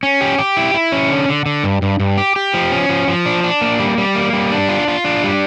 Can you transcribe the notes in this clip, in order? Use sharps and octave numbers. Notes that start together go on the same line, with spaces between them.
C#4
G4
G4
E4
E4
C#4
D3
D3
D3
G2
G2
G2
G4
G4
F3
C#4
F3
F3
D4
D4
A#3
G3
G3
A#3
G3
D4
F4
F4
D4
G3